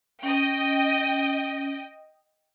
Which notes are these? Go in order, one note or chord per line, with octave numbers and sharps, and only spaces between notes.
C#4 D#5 G5